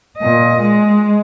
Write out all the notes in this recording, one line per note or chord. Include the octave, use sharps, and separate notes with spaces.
A#2 D#5
G#3